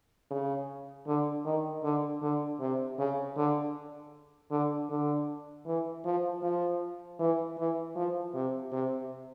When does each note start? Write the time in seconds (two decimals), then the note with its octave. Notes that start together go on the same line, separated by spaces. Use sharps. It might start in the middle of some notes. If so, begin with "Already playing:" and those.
0.31 C#3
1.07 D3
1.45 D#3
1.83 D3
2.22 D3
2.60 C3
2.98 C#3
3.37 D3
4.51 D3
4.90 D3
5.66 E3
6.05 F3
6.42 F3
7.20 E3
7.58 E3
7.96 F3
8.34 C3
8.72 C3